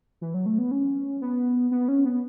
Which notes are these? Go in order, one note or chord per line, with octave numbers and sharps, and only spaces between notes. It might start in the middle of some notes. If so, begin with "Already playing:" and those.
E3
F#3
A3
B3
C#4
B3
B3
C#4
B3